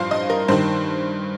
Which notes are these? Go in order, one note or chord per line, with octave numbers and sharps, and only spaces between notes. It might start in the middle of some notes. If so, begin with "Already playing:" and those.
Already playing: G2 F3 C5 F5
D#5
A#4
G2 D#3 C5